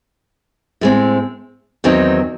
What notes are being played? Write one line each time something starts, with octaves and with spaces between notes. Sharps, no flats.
A2 G#3 C4
E2 D#3 F#3 C4 D#4